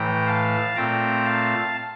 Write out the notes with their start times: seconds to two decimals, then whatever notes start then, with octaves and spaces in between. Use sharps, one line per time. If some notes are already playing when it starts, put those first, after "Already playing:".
Already playing: A2 E3 A3 G5 A#5
0.27 F5 A5
0.76 A#2 A3 C4 G5 A#5
1.25 F5 A5